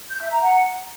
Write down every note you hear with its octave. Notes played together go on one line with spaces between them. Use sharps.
G6
E5
A#5
F#5